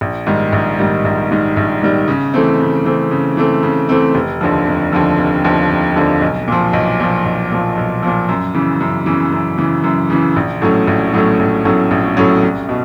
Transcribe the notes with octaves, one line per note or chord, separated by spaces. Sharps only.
A#1
G#2 D#3 G3
A#1
G#2 D#3 G3
A#1
G#2 D#3 G3
A#1
G#2 D#3 G3
C#3
E3 A3 C4
C#3
E3 A3 C4
C#3
E3 A3 C4
C#3
E3 A3 C4
F1
D#2 D3 F3
F1
D#2 D3 F3
F1
D#2 D3 F3
F1
D#2 D3 F3
B1
A#2 F3
B1
A#2 F3
B1
A#2 F3
B1
A#2 F3
F#2
C#3 E3
F#2
C#3 E3
F#2
C#3 E3
F#2
C#3 E3
A#1
A2 F#3 A3 C#4
A#1
A2 F#3 A3 C#4
A#1
A2 F#3 A3 C#4
A#1
A2 F#3 A3 C#4
C2
B2